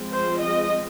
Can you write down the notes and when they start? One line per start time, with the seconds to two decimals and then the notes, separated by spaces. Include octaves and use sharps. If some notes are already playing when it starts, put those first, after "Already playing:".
Already playing: F3 G#3 C4
0.13 C5
0.41 D#5